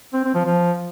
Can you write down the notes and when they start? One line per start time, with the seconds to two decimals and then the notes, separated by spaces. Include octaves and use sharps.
0.13 C4
0.24 C4
0.35 F3
0.45 F3